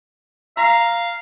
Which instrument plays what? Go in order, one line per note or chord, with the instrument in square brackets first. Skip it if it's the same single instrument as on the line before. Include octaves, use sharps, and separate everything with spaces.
[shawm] F5 [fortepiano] A#5